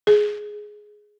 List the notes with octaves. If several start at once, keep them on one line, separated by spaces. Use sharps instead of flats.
G#4